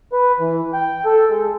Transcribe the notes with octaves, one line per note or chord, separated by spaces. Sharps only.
B4
E3
G5
A4
G#3